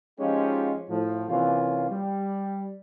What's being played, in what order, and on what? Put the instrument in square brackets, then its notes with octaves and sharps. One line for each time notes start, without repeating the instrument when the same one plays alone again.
[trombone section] F3 G#3 C#4 D#4 F4 G4
A2 F3
C3 E3 A#3 C#4 F4
G3